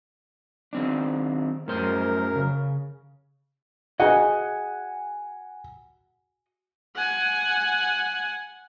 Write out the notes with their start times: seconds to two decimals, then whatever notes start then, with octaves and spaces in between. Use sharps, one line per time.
0.73 D#3 C4 D4
1.68 F#2 A2 A#4 C5
2.36 C#3
4.00 F#4 G#4 D#5 F#5 G#5
6.96 F#5 G#5